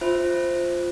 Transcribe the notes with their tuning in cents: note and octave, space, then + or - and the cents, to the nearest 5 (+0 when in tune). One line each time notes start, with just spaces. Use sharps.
F4 +0 C5 +0 E5 +0